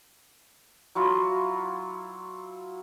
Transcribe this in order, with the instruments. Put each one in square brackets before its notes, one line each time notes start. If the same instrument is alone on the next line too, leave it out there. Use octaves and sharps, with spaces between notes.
[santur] F#3 E4 F4